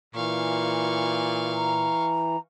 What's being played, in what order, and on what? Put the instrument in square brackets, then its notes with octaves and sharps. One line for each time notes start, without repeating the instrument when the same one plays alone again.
[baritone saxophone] A#2 [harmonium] E3 [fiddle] F5 C#6
[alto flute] A#5